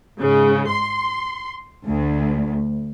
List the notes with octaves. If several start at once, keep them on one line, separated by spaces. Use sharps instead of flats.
G#2 C#3
C6
D2